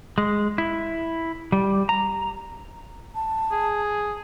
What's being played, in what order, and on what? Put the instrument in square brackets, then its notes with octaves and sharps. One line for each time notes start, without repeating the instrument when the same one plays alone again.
[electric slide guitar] G#3
E4
G3
A#5
[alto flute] A5
[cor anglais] G#4